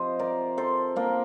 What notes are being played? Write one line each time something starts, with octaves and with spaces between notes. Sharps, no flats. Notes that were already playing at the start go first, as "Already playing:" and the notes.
Already playing: C3 F3 C5 D#5
A#4 D5
A4 C5
A#3 D4